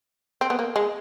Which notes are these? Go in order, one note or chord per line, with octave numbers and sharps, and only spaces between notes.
C4
B3
A#3
G#3